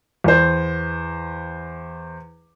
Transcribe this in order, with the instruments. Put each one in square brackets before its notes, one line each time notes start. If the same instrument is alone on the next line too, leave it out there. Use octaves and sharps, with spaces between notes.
[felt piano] E2 C5